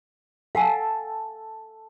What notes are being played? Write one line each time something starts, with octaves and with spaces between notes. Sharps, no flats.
A4 F5 F#5 G#5